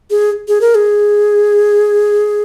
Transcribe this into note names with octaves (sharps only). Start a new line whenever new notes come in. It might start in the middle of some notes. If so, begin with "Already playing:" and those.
G#4
G#4
A#4
G#4